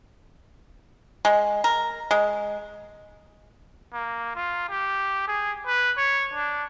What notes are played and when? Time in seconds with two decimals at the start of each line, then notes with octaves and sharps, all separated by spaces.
1.25 G#3
1.64 A#4
2.11 G#3
3.93 A#3
4.35 F4
4.69 G4
5.28 G#4
5.67 B4
5.97 C#5
6.34 D4